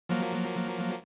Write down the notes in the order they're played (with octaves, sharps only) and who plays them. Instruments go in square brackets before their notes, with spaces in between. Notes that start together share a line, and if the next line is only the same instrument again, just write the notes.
[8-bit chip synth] F3 F#3 A#3